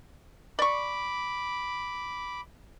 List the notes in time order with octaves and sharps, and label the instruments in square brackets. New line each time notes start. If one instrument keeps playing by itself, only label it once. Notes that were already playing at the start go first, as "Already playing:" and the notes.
[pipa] D5 C#6 [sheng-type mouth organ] B5 D6